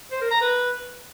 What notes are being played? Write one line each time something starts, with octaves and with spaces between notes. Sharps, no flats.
C5
A#4
A#5
B4